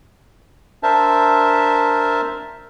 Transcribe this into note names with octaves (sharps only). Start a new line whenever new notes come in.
D4 A#4 C5 E5 A5